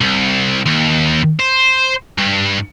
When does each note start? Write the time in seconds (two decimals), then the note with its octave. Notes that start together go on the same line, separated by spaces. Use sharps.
0.01 C2
0.66 D#2
1.39 C5
2.18 G2